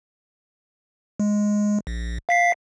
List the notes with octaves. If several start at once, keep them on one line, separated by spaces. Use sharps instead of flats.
G#3
A#1
F5 B6 C7